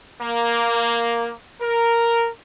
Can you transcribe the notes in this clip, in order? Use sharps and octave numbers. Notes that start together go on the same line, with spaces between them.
A#3
A#4